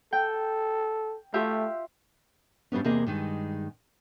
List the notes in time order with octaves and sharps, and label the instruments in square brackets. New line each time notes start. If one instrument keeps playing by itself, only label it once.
[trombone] A4 [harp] G5
[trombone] A3 [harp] F4 G4 E5
[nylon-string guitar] G2 G3 B3 C#4
E2 C3 A#3 G#4 D#5
G2 D#3 G#3